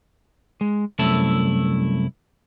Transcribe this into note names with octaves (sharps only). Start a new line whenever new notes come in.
G#3
C2 F#2 A3 E4 A5